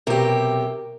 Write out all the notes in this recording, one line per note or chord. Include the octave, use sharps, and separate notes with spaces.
B1 C3 G4 A#4